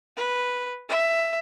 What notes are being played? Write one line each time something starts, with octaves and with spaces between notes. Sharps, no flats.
B4
E5